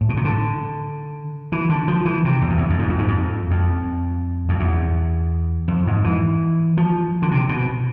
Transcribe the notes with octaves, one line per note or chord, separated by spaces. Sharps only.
A2
B2
C3
D3
E3
D3
F3
E3
C3
E2
F2
E2
F2
G#2
F2
G#2
F2
F2
F2
E2
F2
G#2
E3
F3
D3
C3
B2